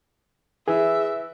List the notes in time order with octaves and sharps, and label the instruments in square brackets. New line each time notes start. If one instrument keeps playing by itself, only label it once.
[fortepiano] E3 [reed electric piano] G#4 [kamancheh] E5